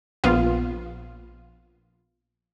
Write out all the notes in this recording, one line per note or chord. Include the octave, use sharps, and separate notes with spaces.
A#1 B3 F4